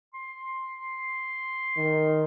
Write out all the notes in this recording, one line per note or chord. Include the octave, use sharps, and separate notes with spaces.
C6
D#3